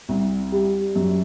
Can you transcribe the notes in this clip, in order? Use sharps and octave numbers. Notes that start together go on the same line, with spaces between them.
C2
G3
F#2